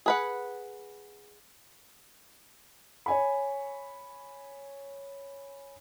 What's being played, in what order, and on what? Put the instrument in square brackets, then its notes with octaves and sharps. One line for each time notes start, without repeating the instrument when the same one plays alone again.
[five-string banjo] G#4 B4 F#5
[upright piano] C#5 G#5 B5